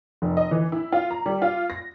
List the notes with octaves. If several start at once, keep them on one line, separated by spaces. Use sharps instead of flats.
F1
D#5
E3
E4
F4
A#5
G3
F4
A#6